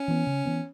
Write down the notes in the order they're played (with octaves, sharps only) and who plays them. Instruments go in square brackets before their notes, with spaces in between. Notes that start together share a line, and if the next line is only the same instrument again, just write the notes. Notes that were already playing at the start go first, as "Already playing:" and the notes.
Already playing: [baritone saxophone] C#4
[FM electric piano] E3 B3
C#3
E3 B3